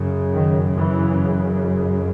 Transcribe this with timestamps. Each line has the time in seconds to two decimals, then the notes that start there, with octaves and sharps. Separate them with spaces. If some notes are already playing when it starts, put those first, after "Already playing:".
Already playing: F#2 C#3
0.34 D#3
0.77 E3